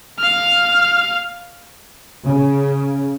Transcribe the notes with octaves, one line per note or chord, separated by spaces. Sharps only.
F5 F6
C#3